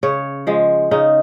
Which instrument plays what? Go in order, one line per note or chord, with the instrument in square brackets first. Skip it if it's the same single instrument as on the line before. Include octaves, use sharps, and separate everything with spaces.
[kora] C#3 C#5
F3 G#3
C#3 D#4